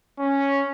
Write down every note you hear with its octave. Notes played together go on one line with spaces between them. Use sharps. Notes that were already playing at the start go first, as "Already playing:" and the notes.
C#4